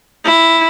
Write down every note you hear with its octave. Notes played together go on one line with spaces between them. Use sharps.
E4